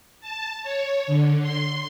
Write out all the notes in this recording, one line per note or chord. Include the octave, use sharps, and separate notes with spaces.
A5
C#5
D3
C6